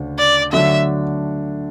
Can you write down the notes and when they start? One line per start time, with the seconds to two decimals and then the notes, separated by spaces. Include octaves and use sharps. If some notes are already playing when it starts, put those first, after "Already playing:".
Already playing: D2 C#3 D4
0.18 D5
0.53 D3 F#3 A3 D4 E5